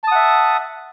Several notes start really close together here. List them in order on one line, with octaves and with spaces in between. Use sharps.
A5 D#6 F#5 E5